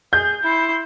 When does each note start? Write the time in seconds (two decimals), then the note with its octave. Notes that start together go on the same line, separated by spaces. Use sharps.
0.13 G#4 G6
0.43 E4 C6